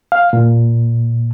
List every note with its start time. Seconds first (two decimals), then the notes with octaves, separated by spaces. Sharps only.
0.12 F5
0.33 A#2